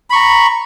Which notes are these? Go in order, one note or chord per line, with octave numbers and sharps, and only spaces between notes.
A#5 B5 C#6